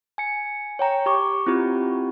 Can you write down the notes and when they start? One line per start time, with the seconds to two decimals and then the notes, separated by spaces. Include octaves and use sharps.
0.18 G#5 C#7
0.79 C#5 G5 A#5
1.06 G4 C#6 D6
1.46 C4 E4 F4 G4